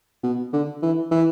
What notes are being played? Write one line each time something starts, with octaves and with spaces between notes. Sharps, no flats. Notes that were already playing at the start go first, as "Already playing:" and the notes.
B2
D3
E3
E3